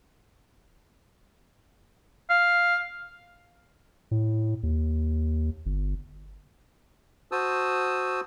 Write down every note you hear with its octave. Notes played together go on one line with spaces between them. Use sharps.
F5
A2
D#2
G1
F#4 C5 A5 D#6 E6